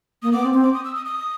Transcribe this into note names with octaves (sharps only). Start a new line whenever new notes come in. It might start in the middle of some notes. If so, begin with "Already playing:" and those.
A#3 D#6
B3 D6
C4
C4
D6
D#6
E6
D#6
D#6